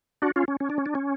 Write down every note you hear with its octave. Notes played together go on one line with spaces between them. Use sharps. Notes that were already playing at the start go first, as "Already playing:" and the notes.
D4 F#4
C#4 F4
C#4
C#4
D4
C#4
D4
C#4